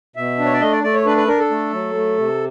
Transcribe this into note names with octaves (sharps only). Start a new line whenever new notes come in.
B2 E5
D4
C#5
D5
A3 D#5
D5
A3 D5
C#5
D4 B4
B4
D4 A#4
A4
A3
F#3
A3
C3